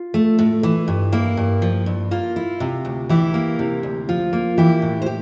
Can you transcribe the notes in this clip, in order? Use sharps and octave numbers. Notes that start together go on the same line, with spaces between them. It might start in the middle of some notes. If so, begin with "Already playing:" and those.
Already playing: F4
A3
A2
E3
G2
A#3 E4
G2
F3
G2
A#3 F4
E4
C3
D2
E3 E4 G4
A#3
C3
D2
F3 F4
A#3
E3 E4 G4
A2
C5
G4